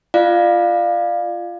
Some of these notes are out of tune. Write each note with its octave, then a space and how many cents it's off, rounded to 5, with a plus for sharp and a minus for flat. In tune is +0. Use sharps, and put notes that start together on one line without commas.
F4 -20 D5 +30 F5 +0